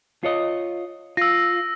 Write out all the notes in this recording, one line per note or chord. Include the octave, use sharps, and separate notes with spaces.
F4 C#5 D#5
F4 E6 A#6